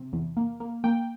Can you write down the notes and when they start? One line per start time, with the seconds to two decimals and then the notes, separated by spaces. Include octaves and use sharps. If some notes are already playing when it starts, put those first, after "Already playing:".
Already playing: C3
0.13 E2
0.37 A#3
0.60 A#3
0.84 A#3 G5